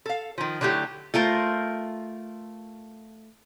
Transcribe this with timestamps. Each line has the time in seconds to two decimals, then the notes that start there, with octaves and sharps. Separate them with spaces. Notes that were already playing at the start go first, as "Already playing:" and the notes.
0.06 A4 F5
0.38 D#3 F3
0.61 D3 F#3 A3 E4 G4
1.14 A3 F4 A#4 C5